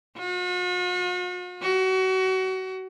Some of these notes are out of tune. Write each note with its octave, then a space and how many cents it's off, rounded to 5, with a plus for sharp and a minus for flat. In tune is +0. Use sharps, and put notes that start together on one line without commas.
F#4 -45
F#4 +30